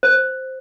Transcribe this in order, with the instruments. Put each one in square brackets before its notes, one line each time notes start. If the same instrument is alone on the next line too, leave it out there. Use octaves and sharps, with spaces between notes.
[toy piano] C5